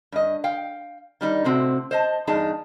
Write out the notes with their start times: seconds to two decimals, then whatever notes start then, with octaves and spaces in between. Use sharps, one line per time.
0.12 G2 D#5
0.44 F5 G5
1.21 D#3 G3 D#4
1.44 A2 C3 C4 F#4
1.91 C5 D#5 A5
2.27 E2 G2 D#4 G#4 A5